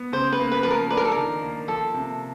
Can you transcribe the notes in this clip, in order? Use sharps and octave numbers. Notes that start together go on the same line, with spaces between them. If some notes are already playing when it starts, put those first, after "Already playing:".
Already playing: B3
C#3 C5
B4
A#3
B4
F3 B4
A#4
D4 B4
A#4
A4
A#4
D#3
A#3
F3 A4
C3